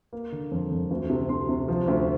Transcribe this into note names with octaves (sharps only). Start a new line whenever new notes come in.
A#3
D3
F2
F2
D2
C3
C3 C6
C3
F3
D2